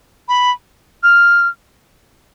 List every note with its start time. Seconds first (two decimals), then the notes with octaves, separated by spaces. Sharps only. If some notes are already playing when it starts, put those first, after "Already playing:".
0.28 B5
1.03 F6